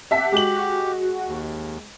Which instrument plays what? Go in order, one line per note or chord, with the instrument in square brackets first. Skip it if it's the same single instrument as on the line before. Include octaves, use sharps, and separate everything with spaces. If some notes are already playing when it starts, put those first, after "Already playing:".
[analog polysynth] G4 F#5 [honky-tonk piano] E5 A5 B6
[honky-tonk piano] G#3 F#7 [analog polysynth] F#4 [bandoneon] G4
[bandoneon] D#2